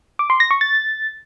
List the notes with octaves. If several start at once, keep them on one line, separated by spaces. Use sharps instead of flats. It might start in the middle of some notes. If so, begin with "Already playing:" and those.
D6
C6
A#6
C#6
A6